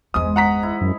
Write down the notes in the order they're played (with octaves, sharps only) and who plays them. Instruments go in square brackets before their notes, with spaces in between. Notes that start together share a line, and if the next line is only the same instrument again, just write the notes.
[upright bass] G1 E2 [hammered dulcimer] G#2 G#3 [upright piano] D#6
[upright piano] F#5 A#5 B6
[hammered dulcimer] E4
[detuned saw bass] F#2